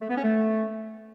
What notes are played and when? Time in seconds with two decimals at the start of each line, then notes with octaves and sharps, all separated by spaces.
0.02 A3
0.09 B3
0.17 C#4
0.24 A3